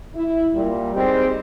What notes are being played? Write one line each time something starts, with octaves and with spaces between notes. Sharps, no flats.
E4
A#2 G3
G3 G#3 C4 D#4 G4